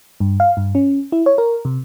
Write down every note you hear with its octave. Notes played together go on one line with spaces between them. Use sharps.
G2
F5
G2
C#4
E4
C#5
A#4
C3